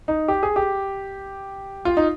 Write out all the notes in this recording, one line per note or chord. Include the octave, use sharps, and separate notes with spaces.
D#4
G4
G#4
G4
F4
D#4